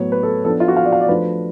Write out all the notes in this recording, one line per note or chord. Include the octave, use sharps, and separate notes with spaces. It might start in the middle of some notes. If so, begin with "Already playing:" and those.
Already playing: A2 F#3 B3 C#5
B4
A4
F3 B3 D4 A4
F4
F#4
F5
D5
F5
D5
F3 A3 D4 B4